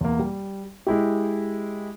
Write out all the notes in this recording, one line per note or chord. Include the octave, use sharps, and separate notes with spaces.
E2 A#3
G3
G#3 E4 G4